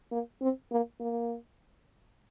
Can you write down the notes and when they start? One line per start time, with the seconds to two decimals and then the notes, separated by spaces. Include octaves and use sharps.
0.11 A#3
0.41 C4
0.71 A#3
1.00 A#3